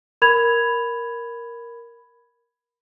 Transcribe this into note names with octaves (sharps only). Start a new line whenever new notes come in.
A#4 B5 G#6 F7